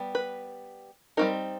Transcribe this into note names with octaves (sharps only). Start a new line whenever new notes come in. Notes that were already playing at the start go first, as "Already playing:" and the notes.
Already playing: G3 B3
B4
G3 C4 D#4 A#4